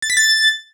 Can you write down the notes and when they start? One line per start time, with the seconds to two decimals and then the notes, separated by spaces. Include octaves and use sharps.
0.02 A6
0.10 B6
0.17 A6